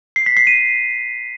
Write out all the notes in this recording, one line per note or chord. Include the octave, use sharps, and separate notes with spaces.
C7
B6
C7
D#7